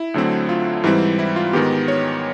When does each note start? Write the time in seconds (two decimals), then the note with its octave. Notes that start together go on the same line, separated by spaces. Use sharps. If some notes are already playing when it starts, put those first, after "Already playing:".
Already playing: E4
0.14 D2 D3 F#3 A3 C4
0.49 F4
0.84 G#2 E3 G3 C4 E4
1.19 E4
1.36 F4
1.53 G#2 D#3 G#3 B3 G4
1.88 C#5